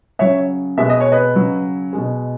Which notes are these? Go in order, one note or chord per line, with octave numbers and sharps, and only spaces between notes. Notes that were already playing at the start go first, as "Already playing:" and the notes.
C#3 F#3 C#5 E5
B2 G#3 E5
D#5
C#5
B4 D#5
C#3 F#3
B2 G#3